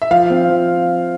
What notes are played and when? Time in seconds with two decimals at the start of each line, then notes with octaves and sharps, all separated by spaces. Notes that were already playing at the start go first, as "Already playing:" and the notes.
0.02 E5
0.11 F3 F5
0.30 C4
0.50 F3